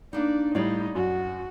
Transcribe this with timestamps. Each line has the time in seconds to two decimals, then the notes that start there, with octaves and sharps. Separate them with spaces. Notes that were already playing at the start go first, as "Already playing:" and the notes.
0.13 A#3 D4 D#4 D5
0.55 A2 G3 D#4 C#5 D5 F5
0.95 F#2 F#4